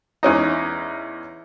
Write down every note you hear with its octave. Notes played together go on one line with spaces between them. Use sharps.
E2 C#4 D#4